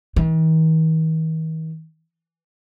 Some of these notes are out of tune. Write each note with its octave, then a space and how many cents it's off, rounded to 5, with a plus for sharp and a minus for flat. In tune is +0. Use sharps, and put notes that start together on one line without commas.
D#3 +45